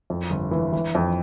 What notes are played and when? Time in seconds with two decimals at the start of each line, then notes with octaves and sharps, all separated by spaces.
0.10 F2
0.30 G1
0.51 E3
0.73 E3
0.95 F2